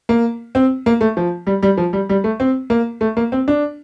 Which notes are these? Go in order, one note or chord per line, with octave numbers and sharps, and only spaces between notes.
A#3
C4
A#3
A3
F3
G3
G3
F3
G3
G3
A3
C4
A#3
A3
A#3
C4
D4